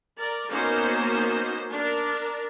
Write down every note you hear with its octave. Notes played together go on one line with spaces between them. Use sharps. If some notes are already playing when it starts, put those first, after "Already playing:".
A#4 D5
A#3 B3 C#4 D#4 F#4 C5
D4 A#4